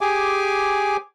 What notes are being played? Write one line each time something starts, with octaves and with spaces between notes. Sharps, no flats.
G4 G#4 G#5 D6